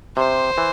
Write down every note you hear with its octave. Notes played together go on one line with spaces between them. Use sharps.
C3 C5
E3